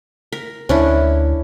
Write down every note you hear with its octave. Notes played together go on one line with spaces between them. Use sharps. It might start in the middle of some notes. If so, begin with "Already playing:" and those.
A#4
D2 C#4 D4 E4